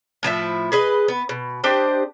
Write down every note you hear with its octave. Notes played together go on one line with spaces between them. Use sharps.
A2 F3 E4 E5
G#4 B4 D#5
B3
B2
D4 G4 C5 D#5